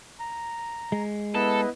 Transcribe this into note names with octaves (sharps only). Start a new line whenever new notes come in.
A#5
G#3
B3 E4 A4 B4 D#5